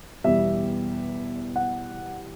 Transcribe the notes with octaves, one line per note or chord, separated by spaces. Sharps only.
E2 B2 G3 E5
F#5